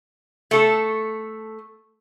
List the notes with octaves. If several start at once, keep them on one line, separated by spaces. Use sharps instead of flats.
A3 A4